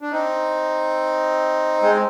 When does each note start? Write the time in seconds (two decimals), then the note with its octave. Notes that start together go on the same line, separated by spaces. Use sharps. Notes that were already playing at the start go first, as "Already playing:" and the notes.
0.01 D4
0.12 C4 D#4
1.82 G#3 C4